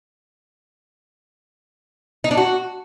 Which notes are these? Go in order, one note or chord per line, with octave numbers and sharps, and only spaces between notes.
D#4
D4
F#4